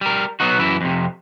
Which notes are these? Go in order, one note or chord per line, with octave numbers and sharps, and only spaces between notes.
G3 A#4
F#3 B3 D#4 F#4
F#2 E3 E4
F2 C3